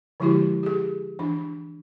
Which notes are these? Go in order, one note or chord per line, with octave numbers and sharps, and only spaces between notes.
D3 F3 G#3 E4 F#4 G4
G4 G#4
E3 D4